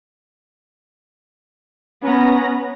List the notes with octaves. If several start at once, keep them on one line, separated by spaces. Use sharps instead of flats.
B3 C#4 A#5 A#6